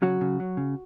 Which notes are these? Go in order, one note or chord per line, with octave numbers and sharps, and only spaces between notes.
C#3 F#3 F#4
C#3
F#3
C#3